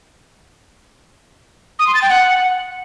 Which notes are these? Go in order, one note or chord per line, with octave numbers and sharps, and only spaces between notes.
D#6
C6
A6
G5
F#5